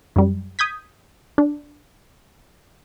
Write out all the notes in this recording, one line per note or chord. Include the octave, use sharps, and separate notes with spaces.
F#2 G3
D#6 G6 G#6 B6
D4